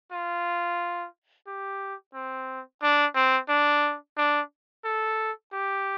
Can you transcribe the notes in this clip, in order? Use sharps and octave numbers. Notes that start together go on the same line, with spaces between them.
F4
G4
C4
D4
C4
D4
D4
A4
G4